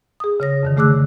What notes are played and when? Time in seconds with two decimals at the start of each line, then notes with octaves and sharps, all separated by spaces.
0.20 G#4 D#6
0.40 C#3 C#5 A#6
0.63 F2 D3 D#3
0.77 C#3 A3 G#4 D6 E6 F#6